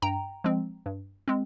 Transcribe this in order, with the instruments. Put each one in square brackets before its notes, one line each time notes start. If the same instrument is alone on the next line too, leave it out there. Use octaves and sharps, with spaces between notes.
[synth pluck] G2 G5 A#5
F3 G#3 C4
G2
G#3 C4